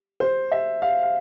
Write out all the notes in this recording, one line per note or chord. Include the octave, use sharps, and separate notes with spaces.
C5
E5
F5
F5